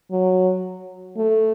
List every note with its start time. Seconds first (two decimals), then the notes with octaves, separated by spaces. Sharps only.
0.11 F#3
1.17 A3